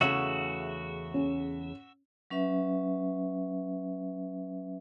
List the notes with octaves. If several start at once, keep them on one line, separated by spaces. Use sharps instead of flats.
E2 C#3 A3 F#4 E5
C#4
F#3 C#4 B4 E5